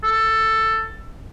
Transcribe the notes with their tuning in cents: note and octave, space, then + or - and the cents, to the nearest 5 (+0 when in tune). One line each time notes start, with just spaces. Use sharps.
A4 +10